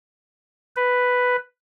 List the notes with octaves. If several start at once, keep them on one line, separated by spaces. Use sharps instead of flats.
B4